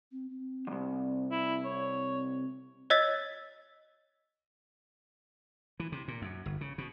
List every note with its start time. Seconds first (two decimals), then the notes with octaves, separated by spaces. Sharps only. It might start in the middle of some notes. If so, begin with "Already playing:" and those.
0.12 C4
0.30 C4
0.67 C2 F2
1.31 E4
1.64 C4 C#5
2.90 C#5 D#5 E6 A6 B6
5.80 E3
5.92 C3
6.08 A#2
6.22 F#2
6.46 G1
6.61 C#3
6.78 B2